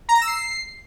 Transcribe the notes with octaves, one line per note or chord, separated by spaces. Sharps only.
A#5
A#6
E6
C7